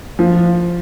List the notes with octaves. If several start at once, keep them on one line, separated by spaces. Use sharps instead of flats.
F3